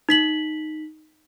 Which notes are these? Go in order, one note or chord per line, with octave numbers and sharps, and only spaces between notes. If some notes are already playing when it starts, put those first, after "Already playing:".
D#4 B6 F#7